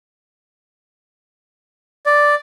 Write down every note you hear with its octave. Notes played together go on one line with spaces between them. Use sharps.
D5